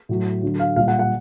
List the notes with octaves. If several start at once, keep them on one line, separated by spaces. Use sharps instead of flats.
A2 F#3
D3 F#3
F5
A#2 G3 F5
F#5
F#5